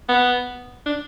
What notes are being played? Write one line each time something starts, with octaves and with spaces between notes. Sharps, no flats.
B3
D4